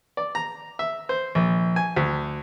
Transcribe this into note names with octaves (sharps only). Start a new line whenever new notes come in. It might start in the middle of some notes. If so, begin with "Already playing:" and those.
D5
A#5
E5
C5
A#1
G#5
D2